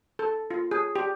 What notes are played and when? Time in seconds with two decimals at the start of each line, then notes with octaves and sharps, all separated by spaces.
0.19 A4
0.51 F4
0.71 G#4
0.96 G4